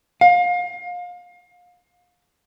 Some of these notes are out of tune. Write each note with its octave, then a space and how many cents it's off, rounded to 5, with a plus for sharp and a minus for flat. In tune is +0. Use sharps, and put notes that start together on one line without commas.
F5 +30